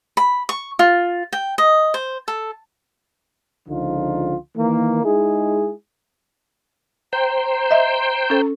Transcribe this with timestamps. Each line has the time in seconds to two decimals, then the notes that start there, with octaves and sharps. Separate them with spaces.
0.17 B5
0.49 C#6
0.79 F4
1.33 G5
1.58 D#5
1.94 C5
2.28 A4
3.68 C#2 D3 F3 D#4 F4
4.57 D#3 E3 A#3
5.03 G#3 D#4 E4 G#4
7.13 C5 G5 A#5
7.71 D#5 E5
8.30 C#4 A4